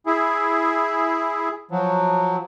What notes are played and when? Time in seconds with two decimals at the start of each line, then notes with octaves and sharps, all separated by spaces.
0.06 E4 G#4
1.71 F3 F#3